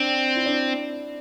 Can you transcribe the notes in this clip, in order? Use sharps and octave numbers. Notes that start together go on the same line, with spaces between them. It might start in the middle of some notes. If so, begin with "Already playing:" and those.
Already playing: C4 D4
E4
D4